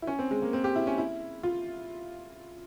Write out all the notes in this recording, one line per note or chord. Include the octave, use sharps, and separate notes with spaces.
E4
C#4
C4
G#3
A#3
C4
G4
E4
C#4
E4
F4